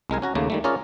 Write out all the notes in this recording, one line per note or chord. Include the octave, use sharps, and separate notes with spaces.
C2 G#3 A#4 G#5
C#4 F#4 A#5
D#2 C#3 A3 A#3
D#3 G3 A3
C#4 F4 G#4 A#4 C#5 D5